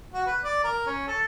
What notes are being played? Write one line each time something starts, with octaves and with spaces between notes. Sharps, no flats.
F#4
B4
D5
A#4
C#4
A4